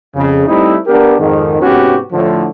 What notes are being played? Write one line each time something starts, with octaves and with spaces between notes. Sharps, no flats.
F2 C#3
G3 A3 C4 D#4 E4
B3 D4 G4 A#4
F2 G#2 D#3
G#2 C3 B3 C#4 F#4 G4
A2 D3 F3